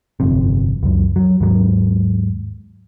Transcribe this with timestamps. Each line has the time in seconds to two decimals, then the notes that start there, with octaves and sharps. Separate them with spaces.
0.20 G1 F2 C3
0.83 C#2 F#2
1.16 F#3
1.41 D#2 G#2 F#3